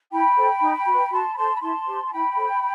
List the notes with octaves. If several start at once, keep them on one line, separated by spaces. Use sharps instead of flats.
E4 G5 B5
A4 C5
D#4
F#4
B4
F#4 A5 C6
B5
A4 C5 A5 C6
B5
E4 A5 C6
G4 C5
A5
E4 G5 B5
A4 C5